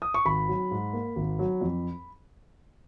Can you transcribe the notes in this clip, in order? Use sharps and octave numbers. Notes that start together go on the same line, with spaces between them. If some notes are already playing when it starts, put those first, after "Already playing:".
D#6
C#6
G#1 B5
F#3
G#2
A#3
G#1
F#3
F2